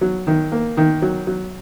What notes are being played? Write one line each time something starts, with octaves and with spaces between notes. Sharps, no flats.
F#3
D#3
A#3
D#3
F#3
F#3